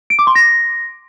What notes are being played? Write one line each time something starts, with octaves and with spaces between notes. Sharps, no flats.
D7
D6
C6
A#6